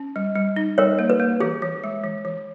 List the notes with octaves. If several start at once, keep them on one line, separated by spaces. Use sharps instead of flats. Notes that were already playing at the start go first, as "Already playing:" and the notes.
Already playing: C#4
G3
G3
D#4
G3 A#4 C#5
A#3
B4
A#3
E3 G#4
E3
G#3
E3
E3